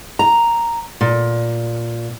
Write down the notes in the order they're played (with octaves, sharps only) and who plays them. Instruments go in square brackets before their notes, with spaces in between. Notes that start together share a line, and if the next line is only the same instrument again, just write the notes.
[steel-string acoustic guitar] A#5
A#2